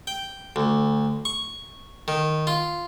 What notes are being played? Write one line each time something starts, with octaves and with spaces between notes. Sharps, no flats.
G5
D2
C#6
D#3
F4